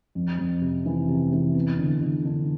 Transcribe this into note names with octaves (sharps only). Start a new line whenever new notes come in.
F2
F2
C3
E3
C3
E3
B3
D3
D3
D3